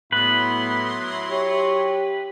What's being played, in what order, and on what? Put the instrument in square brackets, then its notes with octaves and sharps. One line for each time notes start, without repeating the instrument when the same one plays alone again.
[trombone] A2 [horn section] F#3 E4 C6 [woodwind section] B3 [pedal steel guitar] B4
[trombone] G4 [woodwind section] C#5